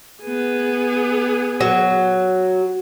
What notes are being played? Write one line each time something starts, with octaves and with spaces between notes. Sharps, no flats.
B3 G#4
F#3